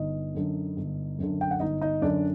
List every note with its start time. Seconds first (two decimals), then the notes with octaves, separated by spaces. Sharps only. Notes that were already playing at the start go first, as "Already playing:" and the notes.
Already playing: G1 D#4 D#5
0.35 F#2 D3
0.77 G1
1.19 F#2 D3
1.41 G5
1.51 F#5
1.60 G1 D#4 D#5
1.81 D#4 D#5
2.02 F#2 D3 D4 D5